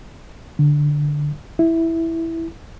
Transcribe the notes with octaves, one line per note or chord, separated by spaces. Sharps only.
D3
E4